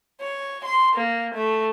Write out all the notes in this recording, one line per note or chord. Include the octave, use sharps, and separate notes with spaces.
C#5
C6
A#3
A3